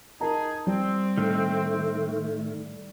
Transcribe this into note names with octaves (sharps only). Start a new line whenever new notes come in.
D#4 G#4 A#4 A5 A#5
G3 C4
A2 D#3 A3